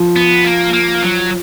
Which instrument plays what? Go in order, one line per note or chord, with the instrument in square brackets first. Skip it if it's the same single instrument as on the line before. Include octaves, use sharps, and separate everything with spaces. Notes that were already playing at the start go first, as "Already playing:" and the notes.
Already playing: [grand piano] F3
[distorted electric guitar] B3
A#3
A#3
F#3